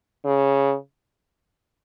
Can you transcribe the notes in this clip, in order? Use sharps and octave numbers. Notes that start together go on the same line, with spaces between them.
C#3